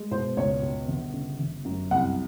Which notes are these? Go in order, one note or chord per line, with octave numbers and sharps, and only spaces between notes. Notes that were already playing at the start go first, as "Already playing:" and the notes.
Already playing: G#3
B2 C5
C#2 C#5
B2
G1
C#3
G1
F#2
C2 F#5